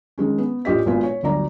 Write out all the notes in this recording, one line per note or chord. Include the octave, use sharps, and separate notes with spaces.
D#3 G#3 C#4
B3
A1 A#2 F4 G4 D#5 B6
G#1 A#2 B3 F4 F#4 G#5
C#5
G1 D2 F#3 D5 A#5